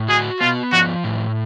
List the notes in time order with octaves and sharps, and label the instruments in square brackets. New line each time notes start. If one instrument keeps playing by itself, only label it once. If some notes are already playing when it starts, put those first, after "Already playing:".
Already playing: [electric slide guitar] A2
[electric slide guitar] F#4 [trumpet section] G#4
[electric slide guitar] B3 [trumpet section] F4
[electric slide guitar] F3 [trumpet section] F#4
[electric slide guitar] A2